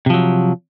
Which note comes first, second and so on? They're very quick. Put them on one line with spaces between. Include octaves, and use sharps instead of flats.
C3 F3 F#3